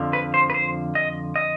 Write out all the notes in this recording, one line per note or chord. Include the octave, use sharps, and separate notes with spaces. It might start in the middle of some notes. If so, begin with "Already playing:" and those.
Already playing: F2 D3 F3
B4
C5
B4
C5
D#5
D#5